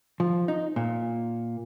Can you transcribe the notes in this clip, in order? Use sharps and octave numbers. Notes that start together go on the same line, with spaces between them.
F3
D#4
A#2